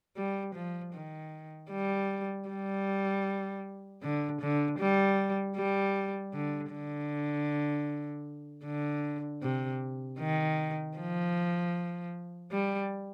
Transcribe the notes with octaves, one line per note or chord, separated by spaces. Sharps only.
G3
F3
D#3
G3
G3
D3
D3
G3
G3
D3
D3
D3
C3
D#3
F3
G3